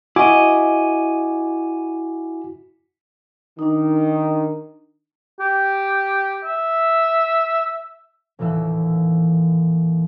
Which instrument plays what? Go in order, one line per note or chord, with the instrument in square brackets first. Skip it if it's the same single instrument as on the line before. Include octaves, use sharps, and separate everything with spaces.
[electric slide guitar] E4 D#5 [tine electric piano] F#4 G#5 D6
[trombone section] D#3 [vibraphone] D4 D#4
[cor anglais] G4
E5
[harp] A1 D#2 A#2 E3 E6 C7